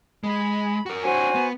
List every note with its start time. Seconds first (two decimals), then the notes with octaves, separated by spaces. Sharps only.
0.24 G#3 B5
0.86 F#4 A#4
1.04 D4 F#4 C5 C#5 G#5
1.35 B3